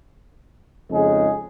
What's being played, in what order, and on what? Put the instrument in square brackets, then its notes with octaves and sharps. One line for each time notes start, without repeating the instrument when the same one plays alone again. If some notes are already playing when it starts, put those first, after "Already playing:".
[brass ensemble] F2 C#3 G#3 D#4 G#4